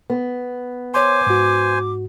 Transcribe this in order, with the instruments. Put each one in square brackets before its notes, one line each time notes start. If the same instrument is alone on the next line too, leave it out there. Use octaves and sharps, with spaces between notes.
[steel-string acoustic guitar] B3
[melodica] C5 G#5 [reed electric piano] C#5 C6 [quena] D6
[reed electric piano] G#2 F#4